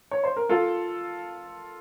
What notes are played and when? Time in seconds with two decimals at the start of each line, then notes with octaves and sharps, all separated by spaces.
0.11 C#5
0.24 C5
0.36 A#4
0.49 F4 A4